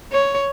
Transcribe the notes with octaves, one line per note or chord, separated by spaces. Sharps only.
C#5